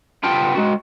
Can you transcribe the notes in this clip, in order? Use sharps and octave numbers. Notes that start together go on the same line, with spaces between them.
B3 D4 F4 G4 G5
G#3 F#4